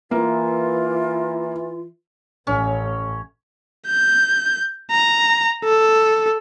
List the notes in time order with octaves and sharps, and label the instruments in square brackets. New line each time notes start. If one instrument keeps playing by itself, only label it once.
[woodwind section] E3 [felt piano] A#3 [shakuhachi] F4
[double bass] A1 [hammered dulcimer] C#4
[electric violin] G6
A#5
A4